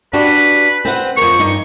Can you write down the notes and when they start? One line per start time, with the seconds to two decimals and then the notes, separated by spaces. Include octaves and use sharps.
0.13 D4 F#4 G4 B4
0.85 C4 B4 F#5
1.17 F2 A#4 C#6
1.39 G2 D#4